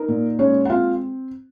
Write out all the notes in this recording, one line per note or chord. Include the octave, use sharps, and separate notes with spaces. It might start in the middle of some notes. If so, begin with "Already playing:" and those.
Already playing: D#4 A#4
A#2
G#3 C#4 C#5
F#5
C4 F4 F5